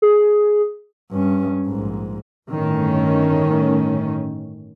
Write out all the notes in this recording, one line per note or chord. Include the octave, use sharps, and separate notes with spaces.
G#4
G2 C#4
A#1 G#2
G1 A2 D#3 A3 C#4